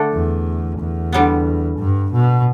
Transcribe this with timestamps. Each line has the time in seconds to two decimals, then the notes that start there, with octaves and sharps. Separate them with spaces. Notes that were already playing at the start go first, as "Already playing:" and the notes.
Already playing: D3 A3 D4 A4
0.14 E2
0.79 E2
1.13 D3 G3 B3
1.78 G2
2.12 B2